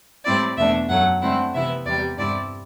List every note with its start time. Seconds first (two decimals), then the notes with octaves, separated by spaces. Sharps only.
0.24 A2 G3 C4 E4 D5
0.57 E2 B2 A3 D4 E5
0.88 F#2 F#3 A3 F#5
1.21 D3 A3 C4 E4 F#5
1.53 C3 E3 B3 E4 E5
1.85 E2 C3 G3 D5
2.17 G2 D3 G3 C4 E4 D5